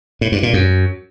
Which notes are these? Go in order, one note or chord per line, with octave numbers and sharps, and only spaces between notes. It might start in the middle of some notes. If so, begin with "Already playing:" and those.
A2
G2
A#2
F#2